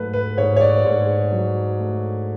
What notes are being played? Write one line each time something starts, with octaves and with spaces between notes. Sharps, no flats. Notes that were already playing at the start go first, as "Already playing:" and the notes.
Already playing: G#2 F#3 A3 B4
B4
G#2 C#5
C#5
D5
G#2
F#3
A3